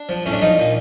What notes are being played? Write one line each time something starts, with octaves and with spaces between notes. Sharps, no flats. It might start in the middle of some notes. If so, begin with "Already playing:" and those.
Already playing: D4
F3
A2 C#4
D4
F3 D#4
A#2